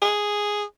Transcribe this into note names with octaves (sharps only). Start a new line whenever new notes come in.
G#4